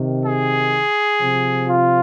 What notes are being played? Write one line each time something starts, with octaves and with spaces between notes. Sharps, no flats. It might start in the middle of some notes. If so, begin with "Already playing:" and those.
Already playing: C3 D#3
G#4
C3 F3
F4